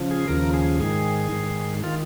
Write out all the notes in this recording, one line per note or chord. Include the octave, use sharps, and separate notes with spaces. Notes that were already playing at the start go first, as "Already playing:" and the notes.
Already playing: C#3 F3
G#4
D#2 C#3 F3 A#4
G#4
G#2 D#3 G#4
G#2 D#3
D#3 F4